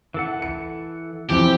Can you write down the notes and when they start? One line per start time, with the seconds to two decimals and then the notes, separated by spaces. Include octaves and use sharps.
0.14 E3 A4 F#5
0.42 C#7
1.30 E3 F3 C4 G4